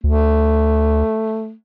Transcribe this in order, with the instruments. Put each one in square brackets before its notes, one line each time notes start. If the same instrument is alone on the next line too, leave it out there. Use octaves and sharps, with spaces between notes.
[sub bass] D2 [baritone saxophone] A3